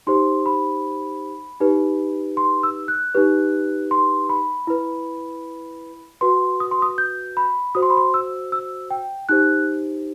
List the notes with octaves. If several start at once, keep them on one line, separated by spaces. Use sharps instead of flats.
D#4 G4 C5 C6
B5
D#4 G4 B4
C6
E6
F#6
D#4 G4 B4
C6
B5
E4 B4
F#4 B4 C6
D#6
C6
D#6
G6
B5
F#4 C5 D#6
C6
B5
C6
E6
E6
G5
D#4 G4 C5 F#6